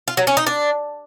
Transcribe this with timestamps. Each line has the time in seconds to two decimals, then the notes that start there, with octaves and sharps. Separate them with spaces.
0.08 F4
0.17 F#3
0.27 C#4
0.37 D#4
0.47 D4